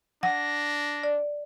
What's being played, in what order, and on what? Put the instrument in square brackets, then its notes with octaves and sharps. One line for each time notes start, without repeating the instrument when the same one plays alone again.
[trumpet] D4 [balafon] F#5 [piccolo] A#6
[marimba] D5